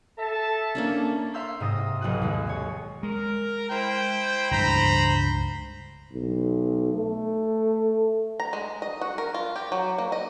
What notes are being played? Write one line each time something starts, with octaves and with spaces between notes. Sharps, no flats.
A4 E5 A5
A#3 C#4 D4
E5 F5 C6 E6 G6 B6
G#2 C3 D#6 A#6
F1 B1 C4 G4 F#6 D#7
D#2 G#3
G4 C#5
G#3 A#4
E4 C5 G5
C#2 G2 C5 A#5 B5
B1
A3
A#5
G#3
D#5
F#4
A#4
F4
G4
F#3
A#3
D#5